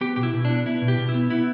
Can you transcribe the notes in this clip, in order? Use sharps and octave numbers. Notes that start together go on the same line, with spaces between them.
B3 G4
B2 G4
E4
B2
B3 D4
B3 E4
B2
G4
B2
E4
B3
B3 E4